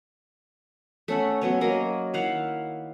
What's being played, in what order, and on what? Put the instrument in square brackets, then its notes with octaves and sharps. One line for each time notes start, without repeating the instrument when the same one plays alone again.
[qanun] A3 C#4 E5 F#5
F#3 B3 C#4 C#5
F#3 A#3 A#4 D#5
D#3 E4 F5 F#5